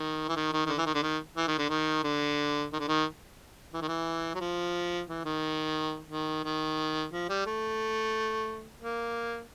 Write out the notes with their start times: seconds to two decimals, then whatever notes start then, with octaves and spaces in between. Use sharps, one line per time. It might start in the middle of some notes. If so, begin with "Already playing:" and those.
Already playing: D#3
0.29 E3
0.35 D#3
0.52 D#3
0.66 D#3
0.69 D3
0.78 E3
0.86 D#3
0.95 D3
1.02 D#3
1.37 E3
1.47 D#3
1.58 D3
1.69 D#3
2.04 D3
2.72 D#3
2.80 D3
2.88 D#3
3.74 E3
3.81 D#3
3.88 E3
4.35 F#3
4.40 F3
5.09 E3
5.25 D#3
6.10 D#3
6.44 D#3
7.12 F3
7.29 G3
7.46 A3
8.80 A#3